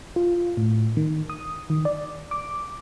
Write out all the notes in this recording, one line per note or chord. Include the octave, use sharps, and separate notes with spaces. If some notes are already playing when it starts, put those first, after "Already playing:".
F4
A2
D#3
D#6
D#3
D5
D6